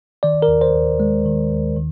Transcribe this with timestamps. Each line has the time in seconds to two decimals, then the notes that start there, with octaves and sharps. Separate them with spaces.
0.23 D#3 D5
0.42 A#4
0.48 D#2
0.61 C5
0.75 D#2
1.00 G#3
1.25 D#3
1.51 D#2
1.76 D#3